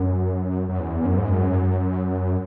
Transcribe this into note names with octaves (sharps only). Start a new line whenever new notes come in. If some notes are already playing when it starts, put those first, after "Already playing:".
Already playing: F#2
F#2
E2
F#2
G#2
F#2